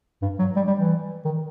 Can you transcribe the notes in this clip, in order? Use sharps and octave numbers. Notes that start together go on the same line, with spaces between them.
G2
F#3
G3
G3
E3
D#3